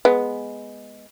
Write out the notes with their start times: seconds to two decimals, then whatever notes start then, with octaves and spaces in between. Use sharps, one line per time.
0.05 G#3 B3